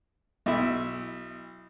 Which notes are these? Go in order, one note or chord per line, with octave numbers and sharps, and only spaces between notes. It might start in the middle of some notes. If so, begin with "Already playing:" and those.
B1 E4